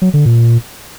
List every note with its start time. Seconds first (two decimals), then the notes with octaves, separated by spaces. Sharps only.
0.02 F#3
0.14 D3
0.26 A#2